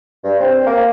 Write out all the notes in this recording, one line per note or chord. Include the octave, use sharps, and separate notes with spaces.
G2
C4
A#3